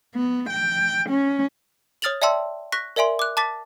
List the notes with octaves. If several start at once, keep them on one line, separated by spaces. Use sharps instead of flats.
B3
G5
C#4
C#5 D#6 F6 A6 F7 F#7
D5 E5 G5 A5 C6 E6
C#6 F#6 A#6 B6
A#4 D5 E5 G#5 C6
D6 F#6
A5 D6 A6 B6